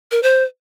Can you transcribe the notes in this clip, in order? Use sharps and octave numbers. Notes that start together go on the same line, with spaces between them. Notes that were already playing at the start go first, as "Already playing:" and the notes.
A#4
C5